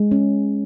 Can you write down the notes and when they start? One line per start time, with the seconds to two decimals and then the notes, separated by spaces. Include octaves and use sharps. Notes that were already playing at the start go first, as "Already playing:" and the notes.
Already playing: G#3
0.11 C#4